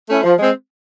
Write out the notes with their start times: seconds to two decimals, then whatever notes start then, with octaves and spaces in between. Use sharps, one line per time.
0.09 A3 C#4 E4
0.24 F3
0.39 G#3 C4